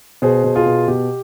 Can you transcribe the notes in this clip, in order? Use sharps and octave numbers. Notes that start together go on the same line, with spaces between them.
B2 G#4 C5
B2
F4 G#4
B2
B2 G4